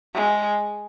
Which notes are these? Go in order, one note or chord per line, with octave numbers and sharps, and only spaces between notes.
G#3